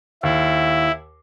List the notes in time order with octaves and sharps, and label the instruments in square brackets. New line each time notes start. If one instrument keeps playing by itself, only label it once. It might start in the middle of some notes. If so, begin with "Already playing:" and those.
[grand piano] D#2 [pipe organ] E4